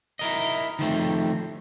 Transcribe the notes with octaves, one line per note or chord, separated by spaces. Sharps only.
E4 A#4 D#5
D#3 F3 A3 C4